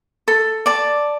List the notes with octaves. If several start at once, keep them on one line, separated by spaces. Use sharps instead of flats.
A4
D5 A5 D6